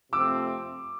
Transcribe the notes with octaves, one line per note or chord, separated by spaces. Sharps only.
C3 F3 A3 C4 D6 E6